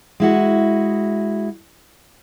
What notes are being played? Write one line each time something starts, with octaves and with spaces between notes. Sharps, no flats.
G#3 E4 F#4